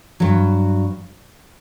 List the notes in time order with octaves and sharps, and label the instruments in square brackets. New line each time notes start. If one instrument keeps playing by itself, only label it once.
[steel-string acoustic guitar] G2 F#3